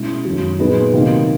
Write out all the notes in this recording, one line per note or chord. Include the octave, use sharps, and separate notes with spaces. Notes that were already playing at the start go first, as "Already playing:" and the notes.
Already playing: B2 G#3 C#4 E4
F#2 D#3 F#3
A#2 F#3 B3 D#4 G#4
C3 D#3 F#3 A#3 D#4